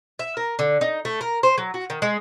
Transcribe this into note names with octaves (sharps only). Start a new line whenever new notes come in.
E5
A#4
D3
D#4
A3
A#4
C5
F#3
F#4
D#3
G#3